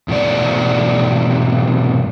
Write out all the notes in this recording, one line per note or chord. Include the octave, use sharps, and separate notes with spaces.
E2 G#2 B2 A3 D5